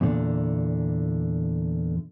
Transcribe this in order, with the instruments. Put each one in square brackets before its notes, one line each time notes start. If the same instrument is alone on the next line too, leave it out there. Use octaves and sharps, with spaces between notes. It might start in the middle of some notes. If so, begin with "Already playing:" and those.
[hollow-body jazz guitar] E2 A#2 D3